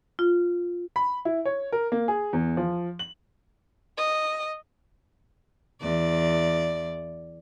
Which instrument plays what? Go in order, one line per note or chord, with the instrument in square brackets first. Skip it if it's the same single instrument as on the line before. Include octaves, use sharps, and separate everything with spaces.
[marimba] F4
[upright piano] B5
E4
C#5
A#4
A#3
G#4
E2
F3
F#7
[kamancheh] D#5
[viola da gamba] E2 D5